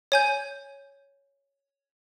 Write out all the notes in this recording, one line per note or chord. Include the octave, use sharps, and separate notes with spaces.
C#5 G#5 G6